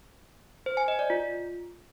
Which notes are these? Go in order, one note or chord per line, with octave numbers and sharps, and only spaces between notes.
C5
G#5
D#5
D5
F4